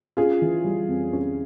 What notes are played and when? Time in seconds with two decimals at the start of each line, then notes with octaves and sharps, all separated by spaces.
0.17 C#4 F4 G#4
0.42 E3
0.64 G3
0.88 F2
1.13 C#4